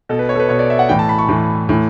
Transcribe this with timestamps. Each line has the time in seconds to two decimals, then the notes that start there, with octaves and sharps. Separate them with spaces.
0.09 B2 A4
0.19 B4
0.29 C#5
0.36 A4
0.40 B4
0.49 B2 C#5
0.59 D5
0.70 E5
0.79 F#5
0.89 A2 E3 G5
0.99 A5
1.09 B5
1.19 C#6
1.29 A2 E3
1.69 A2 E3